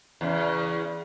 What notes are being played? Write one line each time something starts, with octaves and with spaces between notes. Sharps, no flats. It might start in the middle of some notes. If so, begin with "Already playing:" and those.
E2 C#3